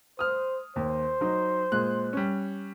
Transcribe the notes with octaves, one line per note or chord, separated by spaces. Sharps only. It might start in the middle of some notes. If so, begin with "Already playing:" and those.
C5 D#6 F6
D#2 C5
F#3 D#4
A#2 G#3 F#6
G3 C#4